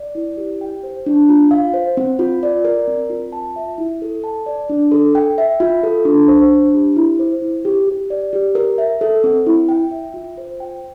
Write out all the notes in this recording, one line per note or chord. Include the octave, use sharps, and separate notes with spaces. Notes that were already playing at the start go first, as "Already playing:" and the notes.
Already playing: D5
E4
G4
G5
C5
D4
F4
F5
C5
C4
F4
D5
A#4
C4
F4
A5
E5
E4
A4
A5
D5
D4
A4
G5
E5
F4
A4
D4
C5
D4
G4
E4
C5
E4
G4
G4
D5
G4
A#4
E5
A4
C4
E4
G5
E5
F4
C5
G5